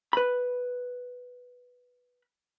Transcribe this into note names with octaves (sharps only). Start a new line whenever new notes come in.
B4 B5